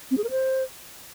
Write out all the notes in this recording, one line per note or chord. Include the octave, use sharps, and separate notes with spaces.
C4
G#4
A#4
C5